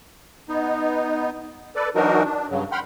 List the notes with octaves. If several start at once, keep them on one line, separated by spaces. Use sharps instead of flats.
B3 D#4
A4 B4 D5
E3 F#3 D4 D#4 F#4 A#4
D4
G2 C#3 F#3
F#5 G5 B5 C6 F6